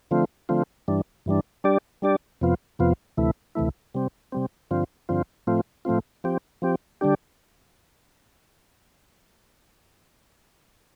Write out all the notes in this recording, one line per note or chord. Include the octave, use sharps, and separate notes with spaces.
D3 F3 A3 C4 F4
D3 F3 A3 C4 F4
G2 E3 G3 D4
G2 E3 G3 D4
G3 D4 G4 D5
G3 D4 G4 D5
F2 C3 F3 B3 F4
F2 C3 F3 B3 F4
D2 C3 E3 A3 E4
D2 C3 E3 A3 E4
C3 G3 C4
C3 G3 C4
G2 D3 F3 C4 F4
G2 D3 F3 C4 F4
A2 F3 A3 C4 F4
A2 F3 A3 C4 F4
F3 C4 G4
F3 C4 G4
D3 G3 D4 G4